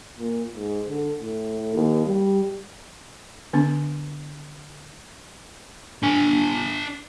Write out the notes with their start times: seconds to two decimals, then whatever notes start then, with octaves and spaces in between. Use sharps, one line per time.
0.18 A#2
0.56 G#2
0.89 D3
1.21 A2
1.74 D#2
2.06 G3
3.53 D3 B3 D4
6.04 D4 G#5